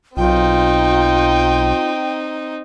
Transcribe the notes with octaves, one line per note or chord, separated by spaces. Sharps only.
B1 C4 D#4 F4 G5